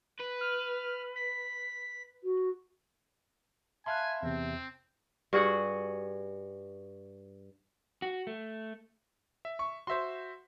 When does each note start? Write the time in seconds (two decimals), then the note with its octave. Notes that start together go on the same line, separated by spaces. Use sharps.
0.19 B4
0.41 F6
1.15 B6
2.24 F#4
3.86 E5 F5 G#5 A5 B5 C6 F#6
4.23 E2 C3 C4
5.33 G2 F#4 G#4 F#5
8.02 F#4
8.27 A3
9.45 E5
9.59 C#6
9.87 F#4 C5 E5 C6